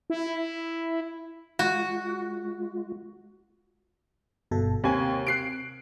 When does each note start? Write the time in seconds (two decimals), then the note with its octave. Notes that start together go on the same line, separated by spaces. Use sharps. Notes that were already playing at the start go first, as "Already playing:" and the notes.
0.10 E4
1.59 G#3 F4 F#4
4.51 G1 B2 A4
4.84 D#2 C3 G#5
5.27 F#6 C7 D7